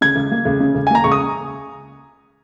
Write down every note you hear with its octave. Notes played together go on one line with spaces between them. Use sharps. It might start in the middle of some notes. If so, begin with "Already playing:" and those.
C#3 G#6
C#2
A#3
C#2
C#3
C#2
G#5
A#3 A#5
C#2 C#6
D#6